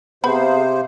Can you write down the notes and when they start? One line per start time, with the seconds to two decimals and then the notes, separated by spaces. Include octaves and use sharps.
0.24 C3 B3 G#4 C5 F5 B5